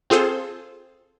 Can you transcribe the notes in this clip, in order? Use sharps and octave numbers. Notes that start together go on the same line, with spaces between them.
C4 F4 G#4 A4 C5